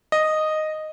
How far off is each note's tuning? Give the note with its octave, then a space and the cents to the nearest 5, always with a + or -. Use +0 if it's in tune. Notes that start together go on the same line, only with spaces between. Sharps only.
D#5 -5